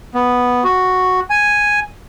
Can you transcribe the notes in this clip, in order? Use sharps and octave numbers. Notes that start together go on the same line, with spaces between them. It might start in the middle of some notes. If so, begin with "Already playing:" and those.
B3
F#4
G#5